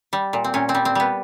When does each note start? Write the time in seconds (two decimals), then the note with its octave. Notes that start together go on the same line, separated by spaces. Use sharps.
0.13 G3
0.33 A#2
0.44 C4
0.54 A#2 C#4
0.69 C4
0.75 G3
0.85 C4
0.95 G3 B3